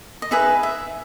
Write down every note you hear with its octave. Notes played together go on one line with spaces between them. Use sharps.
D#5
D#4 G#4 B4 E5
E5